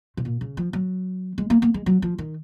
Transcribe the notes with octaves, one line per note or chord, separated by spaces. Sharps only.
C3
A#2
C#3
F3
F#3
G#3
A#3
A#3
G#3
F#3
F3
D#3